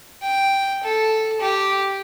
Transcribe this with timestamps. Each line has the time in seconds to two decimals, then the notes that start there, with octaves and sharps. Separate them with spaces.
0.22 G5
0.83 A4
1.40 G4